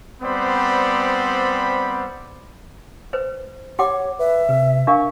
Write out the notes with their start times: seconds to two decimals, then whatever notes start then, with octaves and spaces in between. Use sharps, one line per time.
0.23 G3 B3 C4 C5 D5 B5
3.13 B4 C5
3.79 G4 C#5 F#5 D6
4.19 B4 E5
4.49 C3 B4
4.87 D4 A#4 F5 C#6